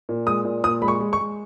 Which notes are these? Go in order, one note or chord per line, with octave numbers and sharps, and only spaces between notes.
A#2
G#3 D#6
A#2
A#2 D#6
G#3 B5
C#6
G#3
C#6
G#3